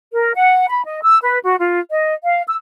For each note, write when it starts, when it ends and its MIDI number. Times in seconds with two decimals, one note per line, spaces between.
0.12 0.31 70
0.34 0.65 78
0.69 0.84 83
0.85 1.01 75
1.02 1.17 88
1.22 1.38 71
1.45 1.55 66
1.59 1.80 65
1.90 2.14 75
2.24 2.44 77
2.47 2.55 88